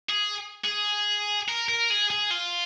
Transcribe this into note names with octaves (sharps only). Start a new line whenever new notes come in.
G#4
G#4
A#4
A#4
G#4
G#4
F4